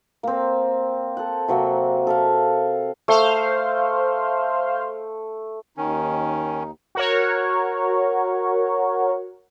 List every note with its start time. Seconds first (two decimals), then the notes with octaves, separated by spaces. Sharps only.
0.23 A#3 C4
1.17 A4 F#5
1.48 C3 F#3 A#3 C4
2.07 A4 E5 F5
3.08 A3 C5 F5
5.77 D#2 D#3 C#4 D#4
6.95 F#4 A#4 C#5